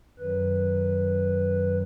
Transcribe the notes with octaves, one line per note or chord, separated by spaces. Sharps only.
F#2 D#3 F#3 B4